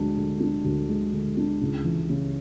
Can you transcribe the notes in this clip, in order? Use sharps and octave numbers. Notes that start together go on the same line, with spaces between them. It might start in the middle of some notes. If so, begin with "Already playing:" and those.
Already playing: D2 D3 G#3 D4
D3
D4
D2
G#3
D3
D4
C#2
E3
C#3